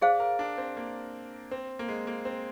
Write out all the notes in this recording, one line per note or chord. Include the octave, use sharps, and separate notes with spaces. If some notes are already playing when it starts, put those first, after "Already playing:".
G#4 C5 D5 F5
A#4
D4
C4
A#3
C4
A#3
G#3
A#3
C4